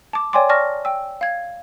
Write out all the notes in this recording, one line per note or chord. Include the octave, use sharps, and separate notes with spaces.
A5 D6
C#5 D5 G5 G#5 C6 D6
D5 A5 C#6 F6 A#6
G5 E6
F5 G#6